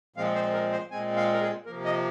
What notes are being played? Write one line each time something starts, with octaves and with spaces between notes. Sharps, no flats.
A#2 F3 G#3 C4 F5
C5
A#4
C5
A#2 G#3 C4 G#5
F5
A#4
G#4
C3 F3 A#3 A#4
D#5